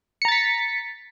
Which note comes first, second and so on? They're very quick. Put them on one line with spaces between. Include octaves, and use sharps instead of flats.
C#7 A#5 A6 B6